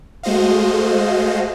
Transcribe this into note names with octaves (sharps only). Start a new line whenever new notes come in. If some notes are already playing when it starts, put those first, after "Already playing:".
G#3 A3 F#4 C5 D#5 F5